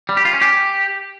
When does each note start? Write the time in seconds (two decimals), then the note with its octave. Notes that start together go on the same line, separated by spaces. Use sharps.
0.09 G3
0.17 G4
0.25 F4
0.33 C#4
0.41 G4